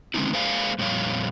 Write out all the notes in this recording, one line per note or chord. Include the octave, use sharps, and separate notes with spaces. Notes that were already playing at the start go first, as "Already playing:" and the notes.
D3 G#3 C4 C#4 D#4 E4
G#3 A#3 C5 D5 F5 G#5
F2 A#2 G3 C4 C#5 F5